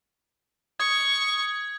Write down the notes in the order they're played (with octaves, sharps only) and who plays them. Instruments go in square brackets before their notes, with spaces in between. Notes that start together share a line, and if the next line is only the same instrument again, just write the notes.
[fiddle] C#6 [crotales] D#6 G#6